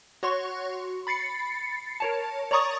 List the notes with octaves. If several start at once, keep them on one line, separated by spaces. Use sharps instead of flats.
F#4 C#5 C6 C#6
B5 A6 C7 C#7
A#4 C#5 A5
C#5 D5 A#5 C#6 D#6 A6